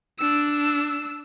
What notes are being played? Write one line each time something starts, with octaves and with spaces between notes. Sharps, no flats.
D4 E6